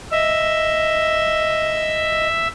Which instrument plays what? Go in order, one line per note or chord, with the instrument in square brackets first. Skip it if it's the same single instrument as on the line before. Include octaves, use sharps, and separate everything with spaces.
[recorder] D#5 [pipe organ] E5